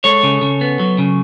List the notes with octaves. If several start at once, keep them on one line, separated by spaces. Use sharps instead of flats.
G#3 A4 C#5
C#3
C#3
B3
F#3
C#3